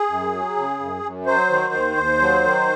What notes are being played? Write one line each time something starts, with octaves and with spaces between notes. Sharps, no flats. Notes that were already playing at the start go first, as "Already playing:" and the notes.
Already playing: G#4
F#2
F#3
C#3
F#2
F#2
F#3 C5
D#3
D#2
D#2
F#3
D#3